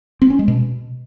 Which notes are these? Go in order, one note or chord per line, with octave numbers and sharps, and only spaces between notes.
C4
C#4
G#3
B2